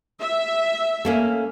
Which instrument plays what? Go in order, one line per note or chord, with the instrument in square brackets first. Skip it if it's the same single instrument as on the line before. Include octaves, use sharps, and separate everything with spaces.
[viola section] E5
[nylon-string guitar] A3 A#3 C#4